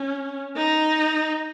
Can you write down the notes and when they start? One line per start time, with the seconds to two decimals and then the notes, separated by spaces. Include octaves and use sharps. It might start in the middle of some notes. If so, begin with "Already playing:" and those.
Already playing: C#4
0.56 D#4